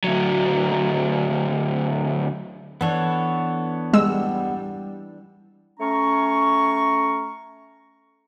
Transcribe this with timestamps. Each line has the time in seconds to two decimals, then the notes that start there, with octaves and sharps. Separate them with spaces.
0.04 D2 F#3
2.81 E3 B3 D4 A4 C#5
3.93 G3 G#3 E6
5.80 A3 C#4 A#5 C#6